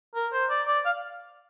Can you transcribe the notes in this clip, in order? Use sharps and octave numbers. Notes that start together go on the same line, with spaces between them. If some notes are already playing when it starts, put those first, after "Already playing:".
A#4
C5
D5
D5
F5